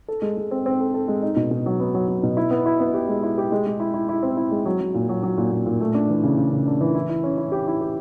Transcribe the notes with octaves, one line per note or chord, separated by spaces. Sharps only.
A4
G#3
G#3
C4
C4
A4
A4
G#3
D#4
B2
B2
F#3
B3
F#3
F#3
B2
E4
B3
E4
B3
G4
G#3
E4
G4
G#3
G#3
E4
E4
E4
C4
E4
G#3
F#3
F#3
A#2
F#3
F#3
A#2
A#2
A#2
A3
D4
E3
C#3
C#3
C#3
D4
E3
E4
E4
C#4
E4
G4
E4
G4